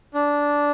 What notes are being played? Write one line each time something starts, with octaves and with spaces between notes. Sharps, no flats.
D4